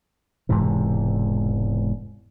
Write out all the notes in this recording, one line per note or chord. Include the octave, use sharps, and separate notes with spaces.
E1 G#2 C3 E3